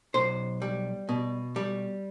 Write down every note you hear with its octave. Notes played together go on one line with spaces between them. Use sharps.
B1 C5
G3
B2
G3